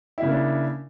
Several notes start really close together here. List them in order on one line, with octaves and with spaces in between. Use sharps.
E4 C#3 A#3 D4